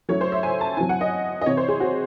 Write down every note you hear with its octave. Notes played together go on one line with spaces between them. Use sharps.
F#3 A3 C#4 E4 C#5
C5
E5
G#5
A5
F#3 C4 E4 G#5
F#5
D#5
D#5
C3 E3 C4 E4 C#5
C5
G#4
F#4